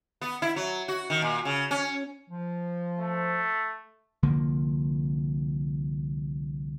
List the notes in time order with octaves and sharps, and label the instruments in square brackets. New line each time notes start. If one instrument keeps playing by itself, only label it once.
[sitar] B3
E4
F#3
F#4
D#3
A#2
C#3
C#4
[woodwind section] F3
[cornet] A3
[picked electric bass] C2 D3 F3 A#3